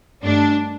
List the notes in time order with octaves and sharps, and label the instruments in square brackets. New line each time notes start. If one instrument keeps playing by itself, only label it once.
[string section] G2 D#3 A3 D4